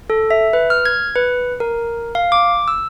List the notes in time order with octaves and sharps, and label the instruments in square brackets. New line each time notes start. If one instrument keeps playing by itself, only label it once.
[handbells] A4
E5
B4
F6
G#6
B4
A#4
F5
D6
E6